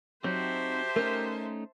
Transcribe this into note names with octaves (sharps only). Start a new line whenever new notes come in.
F#3 C4 D#4 F#4 G4 C5 E5 A5
A3 C#4 D#4 A#4